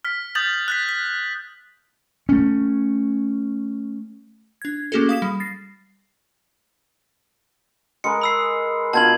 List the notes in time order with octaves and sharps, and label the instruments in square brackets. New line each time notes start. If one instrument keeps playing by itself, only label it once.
[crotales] F6 B6
D#6 G6 A6 F#7
F#6 A6 B6
B6
[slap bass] A3 C#4
[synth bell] D4 G#6
A3 A#3 C#4 F#4 G#4 A4
F5 D#6 B6 E7
G3
A6 A#6 C7
[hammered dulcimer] G#3 A#4 B4 [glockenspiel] C#7
[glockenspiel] B5 E6 C7
[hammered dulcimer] B2 D4 F4 [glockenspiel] A5 G#6 F#7